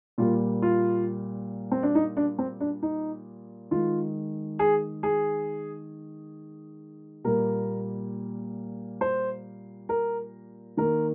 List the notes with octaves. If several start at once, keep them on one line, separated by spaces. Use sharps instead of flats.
A#2 G3 A#3 F4
F4
C4
D4
D#4
D4
C4
D4
D#4
D#3 G#3 F4
G#4
G#4
A#2 G3 A#3 A#4
C5
A#4
D#3 A#3 A#4